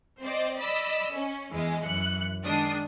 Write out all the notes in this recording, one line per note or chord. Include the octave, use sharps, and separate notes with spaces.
C4 C5 D5 D#5
D5 D#5 B5 E6
C#4
E2 E3 G#3
F#2 E3 F#6 C#7
D#3 G#3 D4 D#6 C7